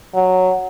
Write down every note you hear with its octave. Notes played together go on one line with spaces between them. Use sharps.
F#3